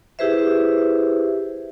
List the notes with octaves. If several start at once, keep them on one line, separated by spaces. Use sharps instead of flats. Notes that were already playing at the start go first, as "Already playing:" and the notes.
E4 G4 G#4 B4 C5 E5